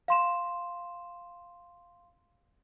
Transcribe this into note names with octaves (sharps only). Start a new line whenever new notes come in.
F5 C6 E7